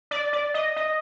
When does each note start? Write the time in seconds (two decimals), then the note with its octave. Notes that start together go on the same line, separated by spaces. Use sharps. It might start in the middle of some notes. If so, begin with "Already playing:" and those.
0.11 D5
0.33 D5
0.54 D#5
0.76 D#5